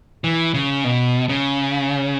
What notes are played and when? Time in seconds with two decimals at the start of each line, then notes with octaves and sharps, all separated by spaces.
0.24 E3
0.54 C#3
0.84 B2
1.29 C#3